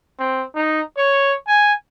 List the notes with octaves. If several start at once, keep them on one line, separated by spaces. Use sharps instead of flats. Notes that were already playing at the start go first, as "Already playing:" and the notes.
C4
D#4
C#5
G#5